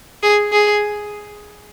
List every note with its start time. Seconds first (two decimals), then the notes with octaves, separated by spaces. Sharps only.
0.23 G#4
0.52 G#4